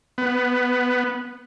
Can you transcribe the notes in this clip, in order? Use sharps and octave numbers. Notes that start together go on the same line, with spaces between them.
B3